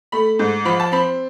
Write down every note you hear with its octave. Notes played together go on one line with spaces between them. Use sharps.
A3 B5
G#2
F3 B5
A5
C4 B5